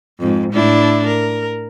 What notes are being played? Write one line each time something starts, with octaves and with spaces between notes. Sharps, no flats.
F2 G#2
A2 D4 E4
A#4